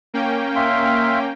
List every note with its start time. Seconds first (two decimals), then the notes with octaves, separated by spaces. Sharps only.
0.14 A#3 C#4 G5
0.56 E5 F5 C6